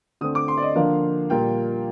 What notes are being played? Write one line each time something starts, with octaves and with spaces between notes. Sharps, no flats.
D3 A3 C4 D#6
D6
C6
D5
D#5
D3 F3 A#3 D4 F4 F5
A#2 G3 A#3 F4 G5